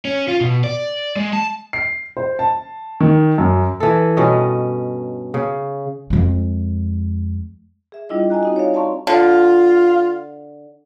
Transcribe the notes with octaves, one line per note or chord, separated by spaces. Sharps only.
C#4
F4
B2
D5
G#3
A5
C7
C5
A5
D#3
F#2
E3 A4
G2 B2 C#4 D#5
C#3
F2 G#3
G#4 E5
G3 D4 E4 F4 D#5
D#5 G#5 A#5 F#6
C4 D#4 F#4
C#5 D5 F5
D5 F5 A5 A#5 C6 C#6
D3 F4